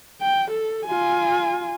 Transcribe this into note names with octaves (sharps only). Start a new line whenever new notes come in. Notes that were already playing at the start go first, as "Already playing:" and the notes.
G5
A4
F4 G#5